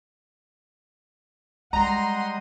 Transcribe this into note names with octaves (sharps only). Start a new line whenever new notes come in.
G3 G#3 D#5 F#5 A#5 C6